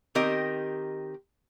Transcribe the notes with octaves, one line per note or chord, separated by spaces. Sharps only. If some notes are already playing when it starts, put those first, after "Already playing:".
D#3 C4 G4 A#4 D#5